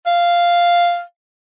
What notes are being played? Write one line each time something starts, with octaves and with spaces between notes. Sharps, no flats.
F5